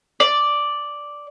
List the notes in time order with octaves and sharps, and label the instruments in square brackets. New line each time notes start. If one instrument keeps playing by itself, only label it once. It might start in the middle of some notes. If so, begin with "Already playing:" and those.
[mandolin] D5